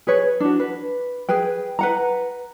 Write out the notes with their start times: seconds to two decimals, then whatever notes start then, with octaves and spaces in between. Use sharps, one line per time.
0.07 G#4 B4 C#5
0.40 D4 F#4
0.60 B4
1.29 G#4 B4 G5
1.79 B4 F#5 A#5